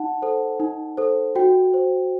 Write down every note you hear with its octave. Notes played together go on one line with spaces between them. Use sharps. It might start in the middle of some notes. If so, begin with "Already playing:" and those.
Already playing: D#4 F#5 A5
A4 C5
D#4
A4 C5
F#4 G5
C5